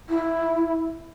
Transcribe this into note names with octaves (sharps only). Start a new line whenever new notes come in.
E4